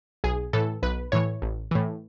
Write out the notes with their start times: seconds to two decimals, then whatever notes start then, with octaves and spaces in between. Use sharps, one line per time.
0.24 B1 G#4
0.53 A2 E3 A4
0.83 B1 B4
1.12 A2 E3 C#5
1.42 A1
1.71 A2 E3